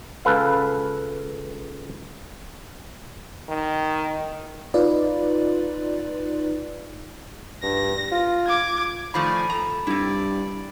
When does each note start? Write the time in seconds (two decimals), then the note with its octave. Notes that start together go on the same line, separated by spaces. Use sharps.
0.25 C#2 A4 B4 F5
3.49 D#3
4.74 D#4 F4 B4 D5
7.63 G2 A#6
8.11 F4
8.47 D6 G#6
9.14 D#3 F3 A3 D5 G#5 B5
9.50 A4 A#5
9.87 G2 C4 E4 D5